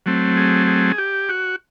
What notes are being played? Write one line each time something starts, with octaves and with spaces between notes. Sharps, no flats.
F#3 A3 C4
G#4
G#4
G4
F#4